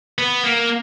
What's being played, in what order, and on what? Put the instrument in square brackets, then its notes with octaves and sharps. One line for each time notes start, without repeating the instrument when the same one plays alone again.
[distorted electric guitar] B3
A#3